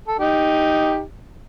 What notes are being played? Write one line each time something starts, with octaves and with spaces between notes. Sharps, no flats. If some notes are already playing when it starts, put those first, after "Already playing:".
A4
D#4 G4